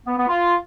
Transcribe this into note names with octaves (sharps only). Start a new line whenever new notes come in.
B3
B3
F4